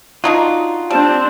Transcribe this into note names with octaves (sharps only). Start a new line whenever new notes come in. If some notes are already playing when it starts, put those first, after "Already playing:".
D4 D#4 F4 F#4
G3 C4 D4 A5